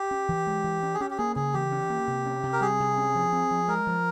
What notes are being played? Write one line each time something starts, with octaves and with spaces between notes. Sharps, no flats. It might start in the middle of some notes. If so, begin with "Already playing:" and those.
Already playing: G4
C#4
E3
G#3
E3
C#4
G#4
C#4 G4
G4
A#3 G#4
C#3 G#4
E3 G4
C#4
A#3
C3
C#4
C3
A#4
G3 G#4
C3
C#4
F3
C4
F3
G#3 A#4
F3